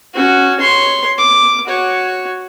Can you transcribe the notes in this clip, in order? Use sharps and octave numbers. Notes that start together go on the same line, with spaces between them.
C#4 F#4
C#5 C6
D6
F#4 C#5